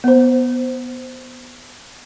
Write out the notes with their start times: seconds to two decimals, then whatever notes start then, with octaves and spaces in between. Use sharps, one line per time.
0.04 B3 C5